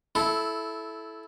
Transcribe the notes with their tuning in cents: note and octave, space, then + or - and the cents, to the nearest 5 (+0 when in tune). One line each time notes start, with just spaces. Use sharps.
E4 +0 A4 -15